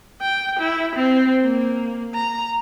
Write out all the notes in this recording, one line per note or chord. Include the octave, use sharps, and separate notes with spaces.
G5
E4
C4
A#3
A#5